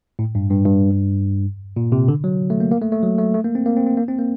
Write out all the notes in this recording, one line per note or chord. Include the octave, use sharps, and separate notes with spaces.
A2
G2
G2
G2
A#2
C3
D3
F#3
A3
A#3
A#3
A3
A3
F#3
A3
A3
A#3
C4
A#3
C4
C4
A#3
C4
A#3